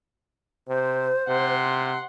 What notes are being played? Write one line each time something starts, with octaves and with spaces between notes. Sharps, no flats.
C3 C5
C3 F#5 C6